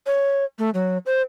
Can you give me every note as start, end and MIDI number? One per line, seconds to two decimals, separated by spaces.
0.07 0.44 73
0.59 0.70 57
0.74 0.98 54
1.06 1.21 72